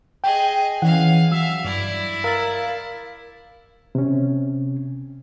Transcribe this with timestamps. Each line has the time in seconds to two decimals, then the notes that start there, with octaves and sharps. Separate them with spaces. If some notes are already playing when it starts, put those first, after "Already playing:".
0.24 G#4 D#5 G5
0.82 E3 C#4 G#4 F5 F#5
1.32 F#3 E5 F5 E6
1.64 G2 E4 D5
2.24 A#4 F5 E6 A6
3.95 C3 C#4